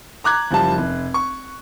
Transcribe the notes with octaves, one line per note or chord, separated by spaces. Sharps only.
A#5 D6 F#6 G#6
F#1 F3 G3 A5
F1
C#6